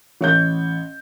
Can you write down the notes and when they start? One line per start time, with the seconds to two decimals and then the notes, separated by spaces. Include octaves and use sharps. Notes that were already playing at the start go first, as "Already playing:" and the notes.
0.21 A1 C#5 G6